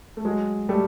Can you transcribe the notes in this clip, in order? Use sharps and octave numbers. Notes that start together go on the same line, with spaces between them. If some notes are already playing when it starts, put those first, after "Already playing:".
A3
F#3 G#3
G3 A3